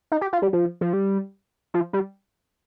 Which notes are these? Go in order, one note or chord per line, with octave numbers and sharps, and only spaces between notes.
D#4
G4
F4
G3
F3
F3
G3
F3
G3